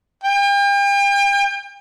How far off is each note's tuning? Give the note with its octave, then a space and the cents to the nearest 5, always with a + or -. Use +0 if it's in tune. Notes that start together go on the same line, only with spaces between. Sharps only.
G5 +40